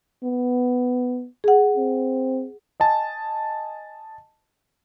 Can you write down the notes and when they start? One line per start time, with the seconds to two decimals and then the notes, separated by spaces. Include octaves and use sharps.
0.23 B3
1.44 G#4 F#5
1.77 C4
2.80 D#5 G#5 A5